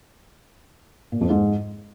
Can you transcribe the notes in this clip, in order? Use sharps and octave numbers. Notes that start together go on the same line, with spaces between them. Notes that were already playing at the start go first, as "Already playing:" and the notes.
A#2
F2
G#2